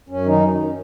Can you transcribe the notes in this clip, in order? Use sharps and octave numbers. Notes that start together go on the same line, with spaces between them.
F#2 C#4
D#3 D#4